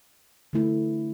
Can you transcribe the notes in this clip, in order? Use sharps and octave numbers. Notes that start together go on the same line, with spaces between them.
D3 A3 E4